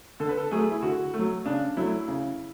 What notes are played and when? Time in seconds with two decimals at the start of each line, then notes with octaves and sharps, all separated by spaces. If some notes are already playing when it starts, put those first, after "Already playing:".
0.20 D3 A4
0.29 B4
0.38 A4
0.51 F#3 A3 G#4
0.71 E4
0.82 D3 F#4
1.14 A3
1.19 F#3
1.45 C#3 D4
1.77 F#3 A3 E4
2.08 C#3